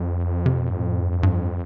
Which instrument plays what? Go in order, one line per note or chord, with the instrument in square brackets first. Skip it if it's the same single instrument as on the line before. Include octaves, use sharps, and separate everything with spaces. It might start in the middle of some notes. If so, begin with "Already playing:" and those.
Already playing: [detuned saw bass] F2
[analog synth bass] C3
B2
G2
A2
G2
G2